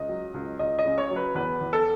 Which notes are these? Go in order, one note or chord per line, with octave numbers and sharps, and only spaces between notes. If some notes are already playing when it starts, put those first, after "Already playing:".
Already playing: C#2 D#5
F#3
C#2
C#2 D#5
D#5
C#3
C#5
F#3
B4
E2 B4
E2
A4